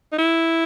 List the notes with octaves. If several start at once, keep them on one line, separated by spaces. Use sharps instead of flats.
D#4
E4